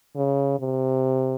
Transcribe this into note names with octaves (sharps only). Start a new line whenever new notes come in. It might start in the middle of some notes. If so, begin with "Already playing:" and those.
C#3
C3